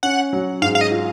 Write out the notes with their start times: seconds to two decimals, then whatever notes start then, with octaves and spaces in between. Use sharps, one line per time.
0.03 C#4 F#5
0.33 F#3
0.62 G#2 F5
0.75 F5
0.81 D#5
0.92 F4